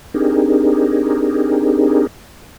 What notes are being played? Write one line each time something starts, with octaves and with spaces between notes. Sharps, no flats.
C4 D4 D#4 G4 G#4 A#4